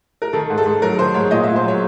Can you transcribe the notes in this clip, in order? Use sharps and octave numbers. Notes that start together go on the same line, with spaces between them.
A#4
D#3 A4
G#2
A4
G#2
F#3 A#4
D#3 C5
G#2 C#5
A#2 D#5
E5
A#2
C5
F#3 C#5